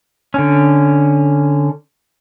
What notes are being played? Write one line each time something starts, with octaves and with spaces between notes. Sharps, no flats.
D3 C#4